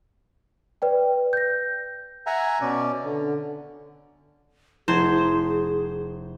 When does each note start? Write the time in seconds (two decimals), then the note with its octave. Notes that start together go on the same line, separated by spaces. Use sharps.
0.82 B4 D5 G5
1.33 G6 A#6
2.26 E5 F#5 G#5 A#5
2.61 B2 C#4 D5
3.05 D3
4.88 F1 E4 G#4 C5 G#6 E7